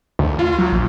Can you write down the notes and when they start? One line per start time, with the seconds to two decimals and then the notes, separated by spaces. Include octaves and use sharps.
0.19 D2
0.39 F4
0.59 F#3
0.73 A#1